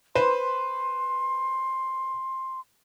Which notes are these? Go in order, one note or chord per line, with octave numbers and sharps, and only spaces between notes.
B4 C5 C6